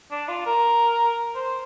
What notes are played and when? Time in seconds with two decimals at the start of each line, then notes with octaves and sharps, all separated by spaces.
0.11 D4
0.28 F4
0.46 A#4
1.35 C5